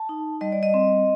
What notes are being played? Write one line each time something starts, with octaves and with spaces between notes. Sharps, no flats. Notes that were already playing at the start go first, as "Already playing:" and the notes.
Already playing: A5
D#4
G3 D#5
D5
D#5
C4